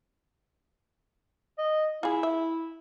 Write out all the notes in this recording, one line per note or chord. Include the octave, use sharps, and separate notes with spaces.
D#5
E4 F4 G#4
E5